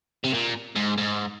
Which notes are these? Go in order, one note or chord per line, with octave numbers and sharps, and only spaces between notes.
C3
A#2
G#2
G#2